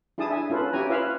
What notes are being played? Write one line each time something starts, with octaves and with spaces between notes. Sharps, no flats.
D4 E4 G#4 A5 D#6
E5 G#5
C#4 F4 A4 B4
C#4 E4 G4 C#5 G#5 A#5
F4 B4 C#5 E5 F5